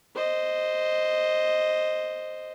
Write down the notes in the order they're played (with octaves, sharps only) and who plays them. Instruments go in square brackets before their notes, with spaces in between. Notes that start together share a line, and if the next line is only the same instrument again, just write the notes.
[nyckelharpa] C5 D#5